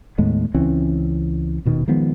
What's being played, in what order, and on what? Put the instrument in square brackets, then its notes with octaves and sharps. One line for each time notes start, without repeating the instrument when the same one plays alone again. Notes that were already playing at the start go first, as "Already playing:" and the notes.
[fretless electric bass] D#2 A2 G#3 B3
C#2 E3 C4 C#4
D#1 B2 D#3
D#3 F3 G#3 B3